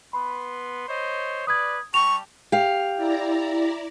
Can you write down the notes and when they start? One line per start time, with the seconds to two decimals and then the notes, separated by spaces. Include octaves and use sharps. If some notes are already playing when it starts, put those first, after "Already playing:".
0.13 B3 B4 B5 C6
0.88 C5 C#5 D#5
1.47 B4 D5 D#6 G#6
1.94 G3 G4 A5 C#6 F7
2.52 G4 F5
2.95 E4 D5 A#5